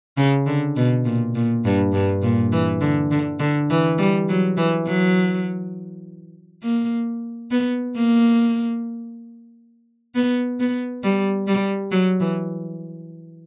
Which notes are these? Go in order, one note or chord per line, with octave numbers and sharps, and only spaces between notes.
C#3
D3
B2
A#2
A#2
G2
G2
A#2
E3
D3
D3
D3
E3
G3
F#3
E3
F#3
A#3
B3
A#3
B3
B3
G3
G3
F#3
E3